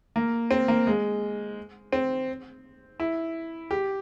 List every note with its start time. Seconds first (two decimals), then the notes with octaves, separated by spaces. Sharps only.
0.16 A#3
0.51 C4
0.68 A#3
0.87 G#3
1.92 C4
3.00 E4
3.71 G4